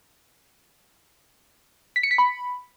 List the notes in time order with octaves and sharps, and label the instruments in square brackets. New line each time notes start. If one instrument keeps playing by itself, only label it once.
[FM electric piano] B6
C#7
B6
B5